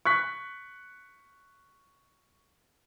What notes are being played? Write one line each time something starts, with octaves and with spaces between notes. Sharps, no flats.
C#6 F#6 B6